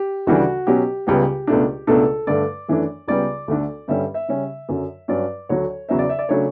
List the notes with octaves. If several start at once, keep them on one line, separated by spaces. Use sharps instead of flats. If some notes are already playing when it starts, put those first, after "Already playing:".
Already playing: G4
D2 C#3 E3 G3 D4 F#4
B2 F#3 C#4 G4
C#2 C#3 G3 B3 G4
C#2 B2 A3 D4
C#2 B2 A3 D4 A4
G2 D3 A3 D5
F#2 E3 A3 D4
C#2 C#3 G3 B3 D5
D2 D3 A3 D4
G2 D3 G3 C#4 E5
E5
C#3 G3 C#4
F#2 D3 F#3
G2 F#3 C#4 D5
D2 D3 F#3 C#5
E2 C#3 F#3 C#4 E5
D5
E5
D5
C#3 F#3 A3 D4 C#5